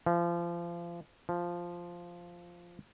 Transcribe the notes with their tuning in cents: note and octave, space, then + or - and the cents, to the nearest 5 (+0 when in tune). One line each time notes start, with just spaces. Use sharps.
F3 -30
F3 -5